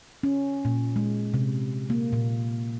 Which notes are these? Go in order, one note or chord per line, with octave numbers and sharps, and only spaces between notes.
C#4
A#2
G#3
C3
A#3
A#2